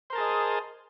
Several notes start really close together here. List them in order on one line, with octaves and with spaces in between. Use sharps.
C5 A#4 A5 G#4 D#5